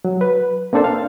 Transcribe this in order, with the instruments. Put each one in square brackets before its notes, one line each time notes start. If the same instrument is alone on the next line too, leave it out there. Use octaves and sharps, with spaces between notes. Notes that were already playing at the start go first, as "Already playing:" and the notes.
[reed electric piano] F#3
B4
A#3 C4 D4 A4 C5
F5